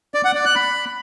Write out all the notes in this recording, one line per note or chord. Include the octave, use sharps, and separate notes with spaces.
D5
F#5
D5
F#6
B5